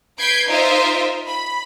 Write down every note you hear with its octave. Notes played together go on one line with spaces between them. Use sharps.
B4 G6 G#6 B6 C7 D7
D#4 F4 A#4 C5 D#5 E5
B5